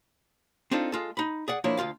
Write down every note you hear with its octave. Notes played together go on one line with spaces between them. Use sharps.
C4 D4 D#4 F4 A4
G#3 F4 A4
D#4 B5
G#4 D5 F#5
F3 A#3 D4 E4 C#5
D2 D#3 F4 F5